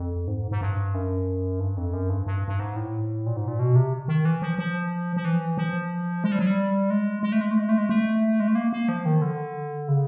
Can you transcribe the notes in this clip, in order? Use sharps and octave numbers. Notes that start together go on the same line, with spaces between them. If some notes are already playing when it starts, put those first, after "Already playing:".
Already playing: F2
G#2
G#2
G2
F#2
G2
F2
F#2
G2
G2
G2
G#2
A2
A#2
G#2
A#2
B2
C3
D#3
E3
F3
F3
F3
E3
F3
G#3
G3
F#3
G3
G#3
G#3
A3
G#3
A3
G#3
A3
G#3
A3
G#3
A3
A#3
A#3
F3
D#3
D3
C#3